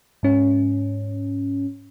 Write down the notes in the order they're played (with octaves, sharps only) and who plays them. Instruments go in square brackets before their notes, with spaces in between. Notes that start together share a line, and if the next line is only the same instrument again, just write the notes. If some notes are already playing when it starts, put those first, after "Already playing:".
[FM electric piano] G#2 C#4